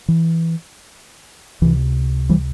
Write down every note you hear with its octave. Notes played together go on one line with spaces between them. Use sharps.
E3
C#2 C3 E3
E3 G3